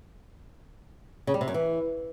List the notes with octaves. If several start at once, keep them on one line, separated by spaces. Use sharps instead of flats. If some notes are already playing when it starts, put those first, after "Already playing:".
C#3
G3
C3
F#2
E3